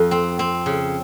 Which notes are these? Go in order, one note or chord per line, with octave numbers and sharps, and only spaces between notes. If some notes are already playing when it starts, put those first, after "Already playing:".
Already playing: F2
C4
C4
C#3